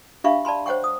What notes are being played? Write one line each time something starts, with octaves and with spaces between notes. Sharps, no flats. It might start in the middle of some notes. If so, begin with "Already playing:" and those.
D4 G4 E5 F5 B5 C#6
D5 A5 B5 C6
C5 C#5 F#5 G5 C#6
D#6